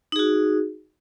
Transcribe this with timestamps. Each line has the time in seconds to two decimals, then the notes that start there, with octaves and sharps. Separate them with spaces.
0.12 D#4
0.16 G#4
0.19 F#4